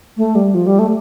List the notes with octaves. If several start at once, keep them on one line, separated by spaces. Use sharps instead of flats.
A3
G3
F3
G3
A3